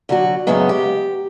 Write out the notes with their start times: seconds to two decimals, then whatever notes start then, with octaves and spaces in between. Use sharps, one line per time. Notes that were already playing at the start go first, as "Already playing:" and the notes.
0.09 D3 F#3 F#4
0.47 F#2 A2 C#3 F#3 G#3 B3
0.69 G4